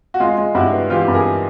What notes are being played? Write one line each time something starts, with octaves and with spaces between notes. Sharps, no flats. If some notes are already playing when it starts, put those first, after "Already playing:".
F#4
G#3 F4
G#3
G2 E4 F#4
B3
E3 F4 G4
G2
G#4 A#4